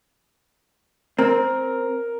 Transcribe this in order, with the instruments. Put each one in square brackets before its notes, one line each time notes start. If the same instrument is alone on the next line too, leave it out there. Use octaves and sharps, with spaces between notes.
[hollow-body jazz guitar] C4 [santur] A#4